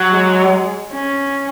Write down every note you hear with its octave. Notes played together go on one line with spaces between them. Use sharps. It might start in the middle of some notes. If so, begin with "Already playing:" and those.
Already playing: F#3
G#3
C#4